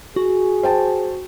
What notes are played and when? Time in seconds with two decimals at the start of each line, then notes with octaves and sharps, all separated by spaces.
0.16 F#4 G#4
0.63 C5 G5 A5